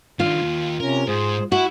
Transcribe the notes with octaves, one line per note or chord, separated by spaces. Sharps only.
D#3 D4 F4
D#2
C3 C#4 A#4
G#2 G#4 C5
E4 F#4 F#5